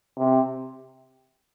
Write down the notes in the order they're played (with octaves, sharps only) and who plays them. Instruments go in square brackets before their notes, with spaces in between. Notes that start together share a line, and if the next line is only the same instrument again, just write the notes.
[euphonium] C3